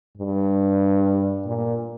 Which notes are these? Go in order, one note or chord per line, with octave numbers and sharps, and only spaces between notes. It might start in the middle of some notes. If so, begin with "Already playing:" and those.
G2
A#2